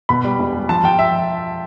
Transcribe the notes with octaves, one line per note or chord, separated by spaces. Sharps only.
B2 B5
G3
E1
G3
F3 A5
F3 G5
E5